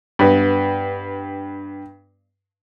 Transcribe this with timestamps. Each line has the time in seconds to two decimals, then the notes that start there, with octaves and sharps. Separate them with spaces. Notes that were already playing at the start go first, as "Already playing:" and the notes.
0.19 G2 B3